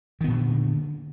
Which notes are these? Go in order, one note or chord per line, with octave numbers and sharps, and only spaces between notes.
A#2 D3 D#3 B3